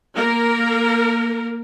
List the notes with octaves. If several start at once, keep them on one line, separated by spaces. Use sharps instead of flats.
A#3 A#4